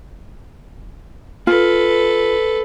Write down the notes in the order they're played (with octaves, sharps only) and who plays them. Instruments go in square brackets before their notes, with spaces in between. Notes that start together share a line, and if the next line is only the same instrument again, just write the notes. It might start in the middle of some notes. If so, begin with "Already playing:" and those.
[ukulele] F4 [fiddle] A4 B4